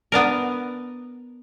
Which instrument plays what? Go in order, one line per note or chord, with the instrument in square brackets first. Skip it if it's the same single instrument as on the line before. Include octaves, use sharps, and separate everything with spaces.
[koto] B3 D4 A#4